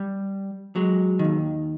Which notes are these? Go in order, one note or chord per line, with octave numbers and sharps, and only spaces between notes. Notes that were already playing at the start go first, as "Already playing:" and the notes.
Already playing: G3
F#3 G#3
D#3
D#2